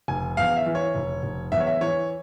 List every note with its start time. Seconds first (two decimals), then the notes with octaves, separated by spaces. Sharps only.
0.08 F1 G#5
0.37 E2 F5
0.57 E5
0.66 E3
0.75 C#5
0.95 F1
1.23 F1
1.52 E2 E5
1.60 C#5
1.67 E5
1.81 E3 C#5